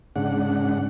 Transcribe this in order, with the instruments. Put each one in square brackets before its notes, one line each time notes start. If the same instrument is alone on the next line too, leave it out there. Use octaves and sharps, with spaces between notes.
[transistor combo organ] G#2 C#3 D4 F#5